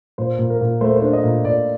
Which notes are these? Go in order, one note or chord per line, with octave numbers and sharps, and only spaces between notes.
A#2 C5
A#2
A#4
A#2
A3 C5
A#4
C5
D4
D#5
A#2
A#2 D5